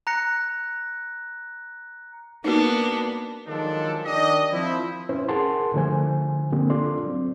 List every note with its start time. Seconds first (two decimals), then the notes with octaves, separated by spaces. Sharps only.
0.07 A#5 F#6 A#6 C#7
2.44 A#3 B3 D4 D#4 F#4
3.47 D#3 F3 F#3 G#3 D4 A4
4.05 D#3 D4 G4 D5 D#5
4.51 F3 C4 E4
5.09 C#4 E4 B4 C5
5.28 E4 G#4 A#4 F#5 A5 C6
5.74 D3 F3 A3 C5 G#5
6.53 D3 A3 A#3 C4 G4
6.70 D4 F4 A4 D5 C6
7.06 F#3 C4